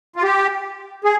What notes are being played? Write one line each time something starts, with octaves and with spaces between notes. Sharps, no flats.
F4
G4
G#4